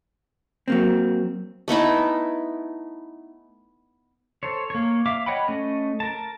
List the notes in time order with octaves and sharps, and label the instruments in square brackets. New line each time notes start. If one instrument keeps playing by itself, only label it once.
[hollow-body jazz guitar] F#3 A#3 C4
[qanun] A3 B3 D#4 E4
[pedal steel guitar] A4 C5 C#5
A#3 C#5
E5 F5 D6
C#5 D#5 F#5 G5 B5
A3 C#4 D#5
A#4 A5